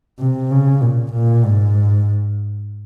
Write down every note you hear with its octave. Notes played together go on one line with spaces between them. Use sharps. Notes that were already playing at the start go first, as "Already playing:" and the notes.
C3
C#3
A#2
A#2
G#2